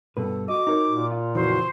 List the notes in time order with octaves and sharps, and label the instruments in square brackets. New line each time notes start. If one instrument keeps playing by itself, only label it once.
[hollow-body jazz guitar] G2 B2 B4 [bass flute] A4
[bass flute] F#4 [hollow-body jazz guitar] D#5 [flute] D6
[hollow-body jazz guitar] D#4 A#4 C#5
[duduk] A#2
[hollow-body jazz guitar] F4
[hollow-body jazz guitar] F2 C#3 E3 [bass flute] F#4 [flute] C5